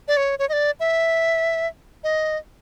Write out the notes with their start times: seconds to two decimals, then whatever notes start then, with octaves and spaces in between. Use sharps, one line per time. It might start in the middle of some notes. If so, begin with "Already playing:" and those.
0.08 D5
0.17 C#5
0.39 C#5
0.49 D#5
0.53 D5
0.80 E5
2.04 D#5